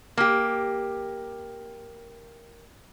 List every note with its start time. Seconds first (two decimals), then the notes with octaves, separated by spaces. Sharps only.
0.17 A#3 G4